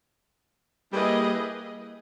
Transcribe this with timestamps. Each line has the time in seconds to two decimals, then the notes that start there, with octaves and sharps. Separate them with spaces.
0.92 G3 A#3 E4 G#4 B4 D#5